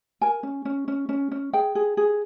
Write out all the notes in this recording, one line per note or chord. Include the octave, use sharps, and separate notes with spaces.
A#4 G#5
C#4
C#4
C#4
C#4
C#4
G#4 G5
G#4
G#4